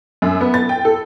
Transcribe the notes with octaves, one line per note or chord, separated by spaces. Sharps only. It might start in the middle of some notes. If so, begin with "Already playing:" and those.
F#2
B3
A6
G5
A4